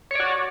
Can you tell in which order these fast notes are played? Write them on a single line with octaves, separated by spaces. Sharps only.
C#5 D5 F#4